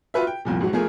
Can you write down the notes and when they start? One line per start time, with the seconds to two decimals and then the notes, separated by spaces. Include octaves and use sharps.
0.14 F4 F#4 B4 E5
0.27 G5
0.45 C2 F2 A#2
0.60 A1 G#2 F#3 F#4
0.73 F3 A3 G#4 A#4